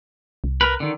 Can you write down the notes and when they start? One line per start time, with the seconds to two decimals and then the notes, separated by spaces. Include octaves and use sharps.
0.44 C2
0.61 A#4 B4
0.80 D3 D#3